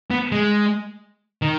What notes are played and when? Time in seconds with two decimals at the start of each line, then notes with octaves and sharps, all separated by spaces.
0.11 B3
0.32 G#3
1.42 D#3